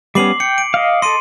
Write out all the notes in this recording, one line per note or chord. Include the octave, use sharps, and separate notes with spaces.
G3 B3 C#4 D6 C7 F#7
G5 C#7
D7
D#5 F5
A4 D#5 C6 D#7